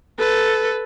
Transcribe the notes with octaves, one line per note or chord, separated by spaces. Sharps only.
A4 B4